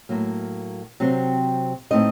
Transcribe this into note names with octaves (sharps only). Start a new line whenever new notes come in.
A2 F#3 A#3
C3 F#3 C4
A2 A3 C4 D#4 D#5